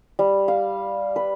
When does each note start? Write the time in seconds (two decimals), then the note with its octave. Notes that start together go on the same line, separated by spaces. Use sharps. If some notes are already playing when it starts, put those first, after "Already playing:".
0.19 G3
0.48 F5
1.16 B4